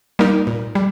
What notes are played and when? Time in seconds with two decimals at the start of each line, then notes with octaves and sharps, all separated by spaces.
0.19 G3 A#3 D#4 A#4
0.47 A#2
0.75 G3